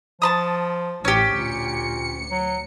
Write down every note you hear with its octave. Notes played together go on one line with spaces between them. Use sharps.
F3 A5 B5 D#6
A1 C#4 G4
D2 A#2 C#7
F#3